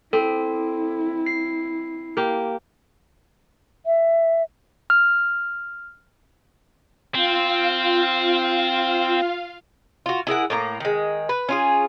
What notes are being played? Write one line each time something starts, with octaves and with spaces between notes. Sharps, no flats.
C4 E4 A4
C7
A#3 G4
E5
F6
C4 F4 F5
F4 F#4
E4 G#4 A#4 F#5
A2 A#3 A#5
D#3 G#3
B4
C#4 F4 G#4